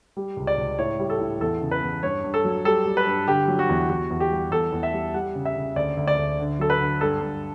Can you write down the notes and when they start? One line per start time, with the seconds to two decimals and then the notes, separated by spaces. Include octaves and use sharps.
0.17 G3
0.37 C#2
0.47 D5
0.58 C#2
0.79 A2 C#5
0.99 G3
1.10 A4
1.20 A2
1.41 E2 A4
1.61 C#3
1.71 B4
1.83 E2
2.03 G2 C#5
2.24 G2
2.34 A4
2.45 F#3
2.65 G3 A4
2.86 G3
2.97 B4
3.07 G2
3.27 D3 G4
3.48 F#3
3.59 F#4
3.69 E2
3.89 E2 F#4
4.10 E2
4.20 G4
4.32 G3
4.51 E2 A4
4.72 E2
4.83 E5
4.93 G3
5.14 G3 F#5
5.35 C#3
5.45 E5
5.56 C#3
5.76 D2 D5
5.97 D2
6.07 D5
6.18 D2
6.39 D3
6.59 F#3 A4
6.70 B4
6.80 D3
7.01 G2 A4
7.21 G2